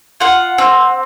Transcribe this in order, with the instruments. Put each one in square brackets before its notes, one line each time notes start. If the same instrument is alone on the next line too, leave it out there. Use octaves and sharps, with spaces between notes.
[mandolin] F4 F#5
C4